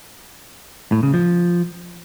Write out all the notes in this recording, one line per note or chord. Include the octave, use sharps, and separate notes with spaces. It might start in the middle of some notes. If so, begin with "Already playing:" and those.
A2
C#3
F3